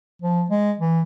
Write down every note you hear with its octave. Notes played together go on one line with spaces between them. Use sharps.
F3
G#3
E3